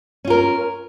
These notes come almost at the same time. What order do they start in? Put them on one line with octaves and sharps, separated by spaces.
C#4 F4 A#4